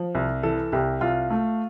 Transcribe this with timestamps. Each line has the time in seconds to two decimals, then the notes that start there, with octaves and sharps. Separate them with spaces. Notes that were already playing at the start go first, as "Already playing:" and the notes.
Already playing: F3
0.15 C2
0.43 E3 A4
0.72 C2 G4
1.01 C2 F4
1.30 A3